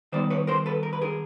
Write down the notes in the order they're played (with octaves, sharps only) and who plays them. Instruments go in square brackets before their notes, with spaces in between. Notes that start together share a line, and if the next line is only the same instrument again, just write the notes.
[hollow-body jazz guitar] D#3 G3 B3 C5 D5
B4 C#5
A#4 C5
A4 B4
A#4
B4
G#4 A#4